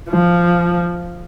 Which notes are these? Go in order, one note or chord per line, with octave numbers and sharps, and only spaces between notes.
F3